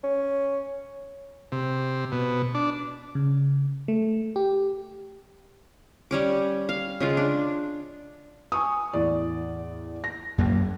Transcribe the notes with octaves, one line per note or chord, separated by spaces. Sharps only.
C#4
C3
B2
D4
C#3
A3
G4
G3 C#4 D6
F5
C#3 G#3 F4
D4
G#5 C#6 D#6
E2 A2 D5
A#6
F#2 A#3